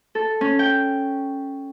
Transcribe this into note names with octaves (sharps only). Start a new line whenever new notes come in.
A4
C#4
G5